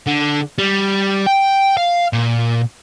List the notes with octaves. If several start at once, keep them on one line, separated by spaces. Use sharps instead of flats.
D3
G3
G5
F5
A#2